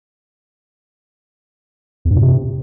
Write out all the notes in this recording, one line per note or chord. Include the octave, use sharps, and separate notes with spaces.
E2
G2
A#2
C3